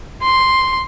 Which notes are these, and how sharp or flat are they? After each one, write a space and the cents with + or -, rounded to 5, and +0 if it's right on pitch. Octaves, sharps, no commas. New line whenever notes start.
C6 +0